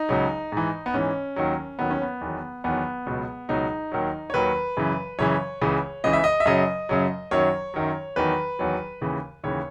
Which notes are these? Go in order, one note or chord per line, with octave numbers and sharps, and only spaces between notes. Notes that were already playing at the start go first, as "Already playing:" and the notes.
Already playing: D#4
C#2 C#3 F#3
G#2 E3
B3
G#2 E3 C#4
D#2 D#3 F#3
D#2 D#3 F#3 B3
C#4
B3
E2 D#3 F#3
E2 D#3 F#3 B3
C#2 B2 F#3
C#2 B2 F#3 D#4
D#2 D#3 F#3
C#5
D#2 D#3 F#3 B4
F#2 C#3 E3
F#2 C#3 E3 C#5
C#2 C#3 E3
C#2 C#3 E3 D#5
E5
D#5
E5
F#2 C#3 F#3 D#5
F#2 C#3 F#3
F#2 D#3 F#3 C#5
F#2 D#3 F#3
E2 D#3 F#3 B4
E2 D#3 F#3
D#2 C#3 E3
D#2 C#3 E3 C#5